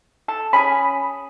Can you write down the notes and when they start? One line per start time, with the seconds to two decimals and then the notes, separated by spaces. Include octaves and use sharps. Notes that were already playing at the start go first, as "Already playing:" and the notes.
0.28 A4
0.53 C#4 G#4 B5